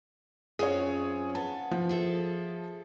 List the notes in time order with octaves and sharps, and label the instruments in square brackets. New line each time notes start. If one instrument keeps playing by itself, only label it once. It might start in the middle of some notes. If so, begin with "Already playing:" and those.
[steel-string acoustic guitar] F#2 C4 F4 [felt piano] G#4 C#5
[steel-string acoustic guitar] B3 [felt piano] A5
[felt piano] F3
[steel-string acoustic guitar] G#4 A4 E5